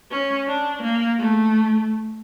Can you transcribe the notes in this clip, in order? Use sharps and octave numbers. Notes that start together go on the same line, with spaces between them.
C#4
D4
A#3
A3